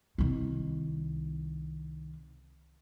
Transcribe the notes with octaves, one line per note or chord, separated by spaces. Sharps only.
C2 D#3